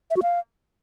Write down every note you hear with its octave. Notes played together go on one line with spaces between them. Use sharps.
E5
F#4
F5